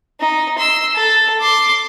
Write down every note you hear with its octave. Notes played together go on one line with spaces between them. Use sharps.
D#4
C6 E6
A4
C6 D6